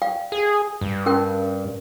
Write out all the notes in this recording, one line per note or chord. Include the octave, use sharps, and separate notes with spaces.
D5 F5 G5
G#4
G2
C#4 A#4 G5